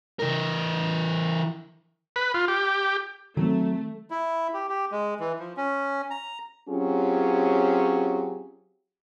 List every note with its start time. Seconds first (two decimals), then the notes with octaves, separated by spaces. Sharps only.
0.19 E3 A#4
2.16 B4
2.34 F4
2.48 G4
3.37 D#3 F#3 A3 C4
4.11 E4
4.54 G4
4.69 G4
4.92 G#3
5.20 E3
5.39 F3
5.57 C#4
6.10 A#5
6.69 F#3 C4 C#4 F4 G4 G#4